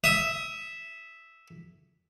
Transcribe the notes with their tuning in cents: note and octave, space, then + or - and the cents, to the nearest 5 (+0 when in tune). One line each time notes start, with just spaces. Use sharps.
E5 +0 D#6 +30